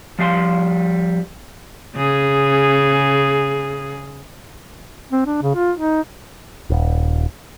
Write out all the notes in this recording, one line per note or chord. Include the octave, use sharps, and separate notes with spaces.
F3 G3 F5 G#5 C6
C#3 G#4
C4
D4
C#3
F4
D#4
D#1